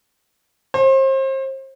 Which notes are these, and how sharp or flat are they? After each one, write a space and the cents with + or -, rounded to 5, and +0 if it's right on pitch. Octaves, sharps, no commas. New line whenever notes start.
C5 +35